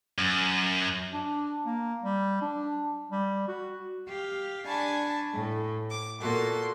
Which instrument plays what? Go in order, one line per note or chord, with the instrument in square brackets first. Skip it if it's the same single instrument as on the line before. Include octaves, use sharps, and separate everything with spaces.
[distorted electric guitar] F#2
[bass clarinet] D4
A#3
G3
D4
G3
F#4
[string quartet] G4 F5
D4 G#5 A5 B5 C#6
A2
D6
A#2 A#3 F#4 A4 C6